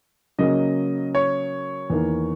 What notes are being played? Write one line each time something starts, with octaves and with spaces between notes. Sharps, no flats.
C#3 F#3 A#3 D#5
C#5
E2 D#3 A#3